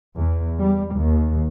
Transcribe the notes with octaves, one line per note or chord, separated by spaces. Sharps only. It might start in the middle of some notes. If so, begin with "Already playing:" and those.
E2
G3
D#2